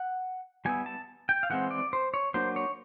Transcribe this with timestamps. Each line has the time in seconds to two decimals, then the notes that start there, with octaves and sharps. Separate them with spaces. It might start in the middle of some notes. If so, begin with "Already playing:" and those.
Already playing: F#5
0.65 G3 B3 E4 G#5
0.86 A5
1.29 G5
1.43 F5
1.50 E3 G#3 C4 F#5
1.71 D5
1.93 C5
2.14 C#5
2.34 F#3 A#3 D4 C5
2.56 C#5